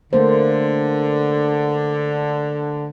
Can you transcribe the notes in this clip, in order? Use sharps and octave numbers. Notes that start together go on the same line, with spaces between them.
D3 A3 A#3 C5